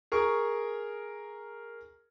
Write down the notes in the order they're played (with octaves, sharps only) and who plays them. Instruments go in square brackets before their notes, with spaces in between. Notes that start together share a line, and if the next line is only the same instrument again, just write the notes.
[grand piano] G#4 A#4 C#6